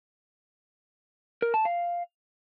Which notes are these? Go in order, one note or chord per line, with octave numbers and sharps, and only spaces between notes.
A#4
A5
F5